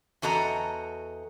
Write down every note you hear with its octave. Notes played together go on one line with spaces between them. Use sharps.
E2 F#4 A4 D#5 A#5